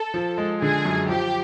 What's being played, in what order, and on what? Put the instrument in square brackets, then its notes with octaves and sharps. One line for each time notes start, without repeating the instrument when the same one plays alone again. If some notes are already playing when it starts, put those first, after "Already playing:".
Already playing: [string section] A4
[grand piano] F3
G#3
[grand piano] D3 [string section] G#4
[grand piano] F#2
[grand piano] F3 [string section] G4